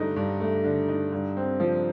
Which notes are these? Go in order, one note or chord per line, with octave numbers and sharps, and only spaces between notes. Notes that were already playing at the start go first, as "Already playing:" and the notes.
Already playing: G2 D3 A3 D#4
G2
A3
D3
D#4
G2
C4
F3